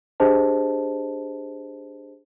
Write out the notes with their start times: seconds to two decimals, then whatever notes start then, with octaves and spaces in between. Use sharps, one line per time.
0.20 D4 G4 G#4 C5 D#5 A5